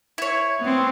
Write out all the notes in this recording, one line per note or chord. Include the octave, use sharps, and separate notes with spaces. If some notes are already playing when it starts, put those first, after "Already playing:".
E4 C#5
B3 C4